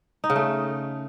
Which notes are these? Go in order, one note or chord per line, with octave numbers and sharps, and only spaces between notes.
D#4
C#3
A3